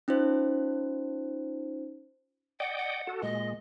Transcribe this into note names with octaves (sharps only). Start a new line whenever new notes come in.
C#4 D#4 F4 C5
D5 D#5 F#5 G5
F#5
F#4 A4
A#2 G#3 D#5